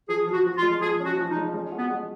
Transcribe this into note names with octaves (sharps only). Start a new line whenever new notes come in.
F3 G#4
F3
F#4
F3
F4
G#3
F3 G#4
C#4
F#4
F3
D#4
G#3
G#3
F#4
B3
G#3